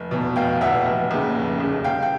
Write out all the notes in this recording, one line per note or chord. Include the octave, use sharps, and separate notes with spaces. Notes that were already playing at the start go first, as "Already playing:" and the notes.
Already playing: F1
E2 B2
F1 F5 G5
E2 B2 E5 F#5
F1
D#2 C#3
F1
D#2 C#3
C2 F5 G5
G5